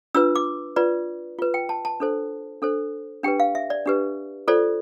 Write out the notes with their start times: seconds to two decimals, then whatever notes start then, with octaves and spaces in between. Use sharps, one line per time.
0.15 D4 F4 B4 E6
0.36 D6
0.76 F4 B4 D5
1.39 F4 B4
1.54 G5
1.69 A5
1.85 A5
2.00 D4 A4 C5
2.62 D4 A4 C5
3.23 D4 G4 B4 G5
3.40 F5
3.55 E5
3.70 D5
3.86 D4 G4 B4
4.48 F4 A4 C5 D5